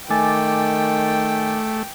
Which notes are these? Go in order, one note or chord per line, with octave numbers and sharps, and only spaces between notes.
D#3 A3 G5 G#5 D6 A6